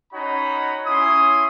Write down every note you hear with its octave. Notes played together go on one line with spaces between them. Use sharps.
C#4 D#4 F#4 C#5 F#5 B5
C#4 E4 C6 D#6